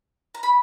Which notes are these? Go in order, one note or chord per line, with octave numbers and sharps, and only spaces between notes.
A#5
B5